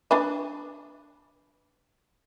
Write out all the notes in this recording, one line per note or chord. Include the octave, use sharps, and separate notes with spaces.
D4 B4 D#5